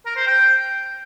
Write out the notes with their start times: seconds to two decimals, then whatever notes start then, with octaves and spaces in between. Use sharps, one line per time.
0.06 A#4
0.16 C5
0.26 G5